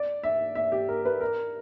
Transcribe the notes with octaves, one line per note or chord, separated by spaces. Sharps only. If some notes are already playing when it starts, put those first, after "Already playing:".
Already playing: D5
E5
E5
G4
A#4
B4
A#4